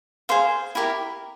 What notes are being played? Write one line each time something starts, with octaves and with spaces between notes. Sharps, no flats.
G#4 C5 F5
E4 G4 A#4